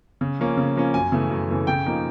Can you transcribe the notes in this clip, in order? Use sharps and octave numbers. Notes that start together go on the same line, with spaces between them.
C#3
F3 A#3 C#4
C#3
F3 A#3 C#4
F#2 G#5
C#3 E3 A3
F#2
C#3 E3 A3
C#3 G5
F3 A#3 D#4